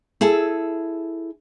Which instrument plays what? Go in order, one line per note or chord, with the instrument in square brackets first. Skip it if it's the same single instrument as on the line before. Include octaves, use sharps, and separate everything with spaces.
[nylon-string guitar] E4 G#4 A4